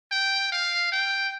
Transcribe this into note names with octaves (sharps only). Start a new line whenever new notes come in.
G5
F5
G5